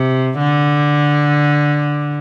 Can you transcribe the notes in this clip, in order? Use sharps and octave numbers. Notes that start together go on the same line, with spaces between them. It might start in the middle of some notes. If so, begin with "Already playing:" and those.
Already playing: C3
D3